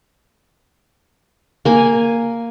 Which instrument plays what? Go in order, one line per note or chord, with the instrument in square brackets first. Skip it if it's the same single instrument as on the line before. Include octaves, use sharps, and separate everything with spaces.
[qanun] A#3 G#5